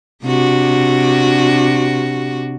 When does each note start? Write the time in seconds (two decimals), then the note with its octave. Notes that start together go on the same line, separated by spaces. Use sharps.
0.24 C3 D4 F#4